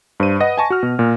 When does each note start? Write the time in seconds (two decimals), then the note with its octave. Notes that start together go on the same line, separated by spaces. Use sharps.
0.20 G2 C5 D#7
0.40 B4 D#5 F#5 A#6
0.58 G#5 A5 C#6
0.70 F#4 F6
0.83 B2
0.99 A#2